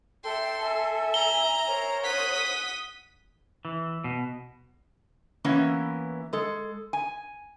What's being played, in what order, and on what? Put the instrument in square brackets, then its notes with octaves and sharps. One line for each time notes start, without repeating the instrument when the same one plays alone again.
[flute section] A4 [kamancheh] E5 G5 [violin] C6
[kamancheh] E5 G#5
[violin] A#5 [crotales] G7
[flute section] A#4 C5 C#5
[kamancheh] F#5 [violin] D#6 B6
[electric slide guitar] E3
B2
[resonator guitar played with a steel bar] E3 A#3 B3 C#4 E4
G#3 A4
G#5